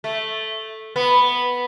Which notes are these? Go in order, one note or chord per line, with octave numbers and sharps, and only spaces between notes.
A3
B3